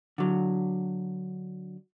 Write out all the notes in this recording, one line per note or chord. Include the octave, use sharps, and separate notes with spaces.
D3 F#3